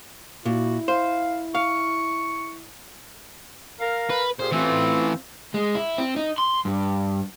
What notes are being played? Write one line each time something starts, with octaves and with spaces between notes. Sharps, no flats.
A#2 E4 F#4
C5 F5
F5 C#6
A#4 F5
B4
A#2 G4 G#4 C5
E3 A3 C4 F4
G#3
E4
C4
D#4
C6
G2